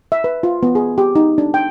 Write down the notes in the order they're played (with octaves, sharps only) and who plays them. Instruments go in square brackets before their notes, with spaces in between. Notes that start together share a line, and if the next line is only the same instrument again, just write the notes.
[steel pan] E5
B4
F4
B3
G#4
G4
D#4
D4
G5